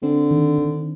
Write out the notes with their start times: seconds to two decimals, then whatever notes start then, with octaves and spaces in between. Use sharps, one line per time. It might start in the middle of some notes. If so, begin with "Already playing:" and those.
0.02 D3 C4
0.31 D#3
0.58 D#3